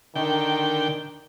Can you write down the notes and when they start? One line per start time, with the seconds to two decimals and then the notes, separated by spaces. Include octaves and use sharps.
0.15 D3 D#3 G5